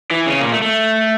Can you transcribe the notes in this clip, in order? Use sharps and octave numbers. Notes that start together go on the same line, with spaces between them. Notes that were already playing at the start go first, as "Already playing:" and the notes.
E3 E4
C#3 C#4
A#2 A#3
A3
A3